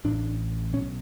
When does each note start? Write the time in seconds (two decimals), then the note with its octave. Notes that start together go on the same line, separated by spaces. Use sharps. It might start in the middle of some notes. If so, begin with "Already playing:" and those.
0.05 A1 A2 D4
0.73 B1 C#4
0.76 B2